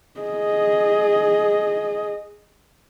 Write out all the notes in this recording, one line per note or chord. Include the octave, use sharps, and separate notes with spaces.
G#4 D#5